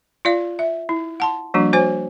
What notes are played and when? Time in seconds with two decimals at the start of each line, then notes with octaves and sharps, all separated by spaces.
0.25 F4 D5 F5
0.59 E5
0.89 E4
1.20 F#5 A5 C6
1.54 F3 G3 A#3 D4 F#4
1.73 F#4 C5 C#5 G#5